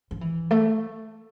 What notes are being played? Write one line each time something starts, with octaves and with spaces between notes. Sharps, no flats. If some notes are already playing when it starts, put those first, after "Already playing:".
F3
E3
A3